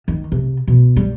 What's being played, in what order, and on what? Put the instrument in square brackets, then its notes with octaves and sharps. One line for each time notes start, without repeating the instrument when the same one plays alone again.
[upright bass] D#3
C3
B2
G3